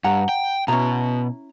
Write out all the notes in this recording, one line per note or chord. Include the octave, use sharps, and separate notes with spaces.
G2 F#5 A#5
G5
B2 C#4 E4 A#5